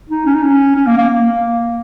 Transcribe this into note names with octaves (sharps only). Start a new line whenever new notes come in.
D#4
C#4
D#4
C#4
C#4
A#3
A#3
A#3